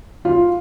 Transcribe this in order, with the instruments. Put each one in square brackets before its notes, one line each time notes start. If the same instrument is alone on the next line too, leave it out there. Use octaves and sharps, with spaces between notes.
[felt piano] F4